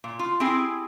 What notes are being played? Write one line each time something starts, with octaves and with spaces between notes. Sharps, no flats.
A#2
F4
C4 E4 G4 G#4 G#5